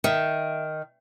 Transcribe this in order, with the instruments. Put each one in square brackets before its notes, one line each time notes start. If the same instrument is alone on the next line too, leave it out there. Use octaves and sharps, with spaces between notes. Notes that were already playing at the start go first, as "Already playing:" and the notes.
[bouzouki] D#3 [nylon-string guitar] E5